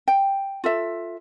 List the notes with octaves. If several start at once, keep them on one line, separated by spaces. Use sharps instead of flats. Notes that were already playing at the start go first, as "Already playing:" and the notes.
G5
F4 A4 E5